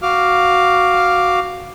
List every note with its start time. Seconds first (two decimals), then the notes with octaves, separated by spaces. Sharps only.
0.02 F#4 F5 D6 F6